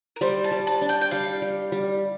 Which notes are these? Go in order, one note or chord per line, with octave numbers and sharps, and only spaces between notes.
A#4
G3 C5
A5
G3
A5
D4
G5
G5
G3 F5
G3
G3